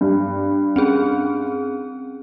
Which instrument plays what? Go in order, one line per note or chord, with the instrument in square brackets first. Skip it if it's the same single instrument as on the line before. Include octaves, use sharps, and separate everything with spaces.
[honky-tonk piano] G2
[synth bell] C4 C#4 G#4